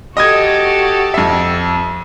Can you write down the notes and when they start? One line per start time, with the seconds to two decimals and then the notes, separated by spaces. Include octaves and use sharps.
0.17 F#4 G4 A4 D#5 D#6 G#6
1.14 F2 E5